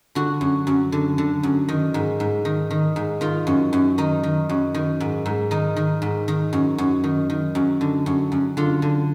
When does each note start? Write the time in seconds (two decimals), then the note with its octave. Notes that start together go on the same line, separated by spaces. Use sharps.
0.15 D3 F#4
0.41 F#2
0.67 F#2
0.92 D3
1.18 D3
1.43 F#2
1.68 D#3
1.94 G#2
2.20 G#2
2.45 D#3
2.71 D#3
2.96 G#2
3.21 D#3 F4
3.47 F#2
3.73 F#2
3.98 D#3 D#4
4.23 D#3
4.49 F#2
4.74 D#3
5.00 G#2
5.26 G#2
5.51 D#3 D#4
5.76 D#3
6.02 G#2
6.28 D#3
6.53 F#2
6.78 F#2
7.04 D#3
7.30 D#3
7.55 F#2
7.81 D3
8.06 F#2
8.32 F#2
8.57 D3 F4
8.82 D3